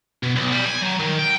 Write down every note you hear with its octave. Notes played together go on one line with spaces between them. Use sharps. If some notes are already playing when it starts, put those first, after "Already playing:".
B2
B1
G3
G#5
F#3
D#3
G5